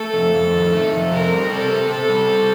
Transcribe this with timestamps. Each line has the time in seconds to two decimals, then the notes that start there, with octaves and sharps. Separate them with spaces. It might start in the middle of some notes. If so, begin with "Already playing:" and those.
Already playing: A3 A4
0.14 F2
0.34 F2
0.52 D#3
0.72 A3
0.92 F2
1.11 C3 A#4
1.32 G3
1.50 C4 A4
1.70 C3
1.90 C3 A4
2.09 G3
2.29 C4